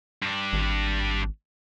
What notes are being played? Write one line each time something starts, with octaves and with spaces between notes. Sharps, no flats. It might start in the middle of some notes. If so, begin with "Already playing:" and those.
G2 D4
G#1